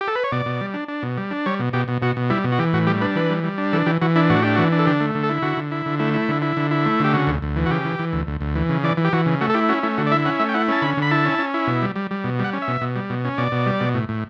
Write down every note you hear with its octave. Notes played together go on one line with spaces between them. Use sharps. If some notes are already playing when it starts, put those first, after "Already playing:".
G4
A4
B4
C#5
B2 D5
B2
G3
D4
D4
B2
G3
D4
G3 C#5
B2
B2 G4
B2
B2 F#4
B2
G3 E4
B2
F#4
E3 G4
A2 F#4
G3 G4
D4 B4
E3 B4
G3
G3
D4
E3 A4
E3 G4
E3 F#4
D4 E4
A2 F#4
D4 G4
E3 F#4
D4
A4
D3 G4
A3
D3
A4
E4
D3 F#4
D3
E4
D3
A3 E4
E4
D3
E4
D3
E4
A3
D3 G4
C#3 F#4
D2
D2
E3
F#4
C#3 G4
E3
E3
D2
D2
D2
E3
C#3
E3 D5
E3
G4
E3 F#4
C#3
A3 F#4
A4
E4 G4
C#4 F#4
A3 E4
D3 F#4
D5
E4 E5
C#4 F#5
A3 E5
G5
E4 F#5
C#4 A5
D3 B5
D3 B5
E4 A5
C#4
C#4
E4
B2
G3
G3
G3
B2
G3 F#5
C#4
E5
B2
B2
G3
B2
C#4
B2 D5
B2
G3
B2
A2
A2